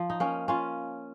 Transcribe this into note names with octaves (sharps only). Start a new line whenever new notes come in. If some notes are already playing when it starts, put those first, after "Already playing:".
Already playing: F3
D#4
A#3 C#4
C#4 F4